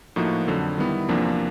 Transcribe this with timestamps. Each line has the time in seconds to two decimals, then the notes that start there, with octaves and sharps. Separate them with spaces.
0.16 A2 F3 A#3 D#4 F#4
0.47 F2 D3 F#3
0.78 D#3 G3 B3 E4
1.09 E2 C3 F3 A#3 D4